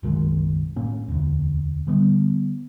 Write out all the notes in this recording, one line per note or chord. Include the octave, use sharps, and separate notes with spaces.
F#1 B1 D#3 G#3
A2 A#3 C#4
E1 D2
D3 G3 B3